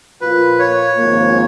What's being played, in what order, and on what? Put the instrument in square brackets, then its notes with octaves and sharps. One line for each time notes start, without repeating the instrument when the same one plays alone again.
[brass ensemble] A#2 F3 A#3 F4 [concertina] B4
[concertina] C#5
[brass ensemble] G#1 G#2 F3 A#3